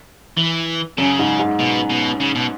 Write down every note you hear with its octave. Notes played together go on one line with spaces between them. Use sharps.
E3
F#2 C#3
G#2
G#2
B2
B2
C#3
B2